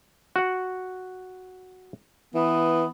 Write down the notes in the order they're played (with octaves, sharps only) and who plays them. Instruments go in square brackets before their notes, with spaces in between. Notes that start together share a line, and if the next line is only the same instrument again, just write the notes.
[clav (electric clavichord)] F#4 F#5
[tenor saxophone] E3 [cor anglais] B3